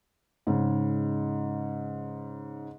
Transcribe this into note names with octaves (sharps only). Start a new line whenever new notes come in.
G#2 C#3